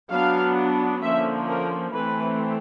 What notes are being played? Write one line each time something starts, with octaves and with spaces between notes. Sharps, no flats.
F#3 B3 D4 F5
D3 F3 A#3 C#4 E5
A#4
E3 A3 C4 B4